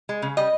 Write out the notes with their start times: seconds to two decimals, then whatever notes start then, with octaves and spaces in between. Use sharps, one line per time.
0.09 G#3
0.22 C#3
0.37 G3 D#5